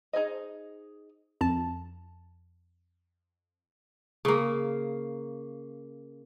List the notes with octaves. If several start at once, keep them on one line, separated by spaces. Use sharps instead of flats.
D#4 G#4 C5 D#5
F2 A5
C#3 A#3